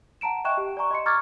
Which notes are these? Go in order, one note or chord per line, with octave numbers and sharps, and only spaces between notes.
F#5 A5 A#5 D7 E7
D#5 E5 G5 C#6 F#6 E7
G4
D5 G#5 A#5 C#6
D#5 C6 C#7
A#5 C#6 D6 F6 G#6 A6